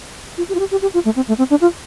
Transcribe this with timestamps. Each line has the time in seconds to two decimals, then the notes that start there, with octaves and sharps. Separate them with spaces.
0.38 F4
0.49 G4
0.55 F4
0.59 G4
0.71 G4
0.82 G4
0.94 F4
1.05 A3
1.16 C4
1.28 A3
1.38 C4
1.50 D4
1.61 F4